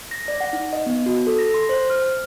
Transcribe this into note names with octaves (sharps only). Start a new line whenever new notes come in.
A#6
D5
F#5
D#4
D#5
B3
F#4
A4
A#6
C6
C5
F6